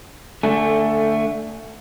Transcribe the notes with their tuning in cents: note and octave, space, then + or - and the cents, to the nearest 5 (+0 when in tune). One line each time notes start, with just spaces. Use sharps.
D3 +0 A3 +15 G#5 +0